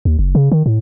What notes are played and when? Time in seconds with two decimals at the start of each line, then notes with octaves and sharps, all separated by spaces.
0.05 D#2
0.19 F#1
0.35 C#3
0.52 D#3
0.66 A2